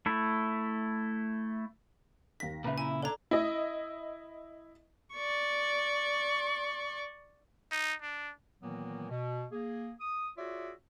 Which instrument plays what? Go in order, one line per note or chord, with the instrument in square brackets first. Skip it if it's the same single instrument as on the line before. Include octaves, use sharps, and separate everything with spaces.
[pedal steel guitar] A3 E4
[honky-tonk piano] D#2 A#6 [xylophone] B6
[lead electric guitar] A#2 C#3 [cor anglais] B4 [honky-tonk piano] E5 A#5
[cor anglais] E4 [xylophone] G#5
[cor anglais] D4 [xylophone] A4 A#5 [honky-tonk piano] D5 G#6
[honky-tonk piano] E4 D#5
[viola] D5 C#6
[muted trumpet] D#4
D4
[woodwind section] A#2 D#3 E3 F#3 A#3 B3
B2
A#3 G#4
D#6
F4 F#4 G#4 C#5 D5 E5